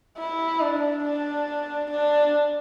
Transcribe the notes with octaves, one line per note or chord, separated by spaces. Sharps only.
E4
D4
D4
D4